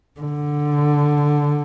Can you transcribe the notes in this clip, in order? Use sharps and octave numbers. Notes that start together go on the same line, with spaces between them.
D3